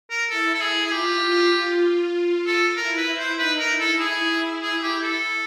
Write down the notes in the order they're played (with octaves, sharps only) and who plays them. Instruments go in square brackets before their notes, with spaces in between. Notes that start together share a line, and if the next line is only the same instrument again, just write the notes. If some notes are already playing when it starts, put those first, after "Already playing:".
[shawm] A#4
[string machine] E4 [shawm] A4
[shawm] A4
G#4
G#4
[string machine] F4 [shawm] G4
[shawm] A4
[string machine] E4 [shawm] A#4
[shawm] B4
C5
[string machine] D#4 [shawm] B4
[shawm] A#4
[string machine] E4
[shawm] A4
G#4
G#4
G4
A4